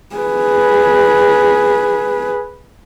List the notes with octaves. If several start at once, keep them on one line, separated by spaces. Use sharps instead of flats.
G#4 B4